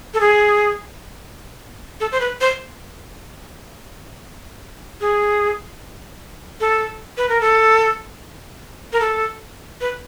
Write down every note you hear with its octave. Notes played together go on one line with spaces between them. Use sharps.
A4
G#4
A4
C5
B4
C5
G#4
A4
B4
A#4
A4
A#4
A4
B4